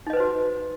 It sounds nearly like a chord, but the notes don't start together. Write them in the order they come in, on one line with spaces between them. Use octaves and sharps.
D#4 D#5 B4 C5 F#4